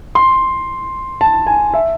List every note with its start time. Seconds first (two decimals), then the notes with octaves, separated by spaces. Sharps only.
0.15 C6
1.21 A5
1.47 G#5
1.74 E5